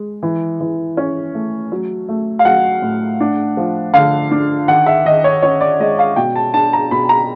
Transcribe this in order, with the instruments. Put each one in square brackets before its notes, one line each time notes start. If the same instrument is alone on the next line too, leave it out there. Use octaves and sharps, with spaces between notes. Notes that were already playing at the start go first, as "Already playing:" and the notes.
Already playing: [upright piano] G#3
E3
E3
C#4
A3
F#3
A3
F5
F#3 F#5
A2
D4
F3
D3 F5
D4
D#3 F#5
E5
D#3 D#5
C#5
C#4 C#5
D5
G#3 D#5
F5
B2 G5
A5
D4 A5
A#5
B2 B5
A#5